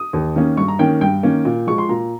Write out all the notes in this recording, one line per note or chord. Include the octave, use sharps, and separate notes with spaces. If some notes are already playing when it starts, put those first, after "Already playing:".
Already playing: D#6
D#2
D#3 A#3 C#4
G2 C#6
A#5
D#3 A#3 C#4 G5
G2 G5
D#3 A#3 C#4
A#2
F3 G#3 C#6
C6
A#2 A#5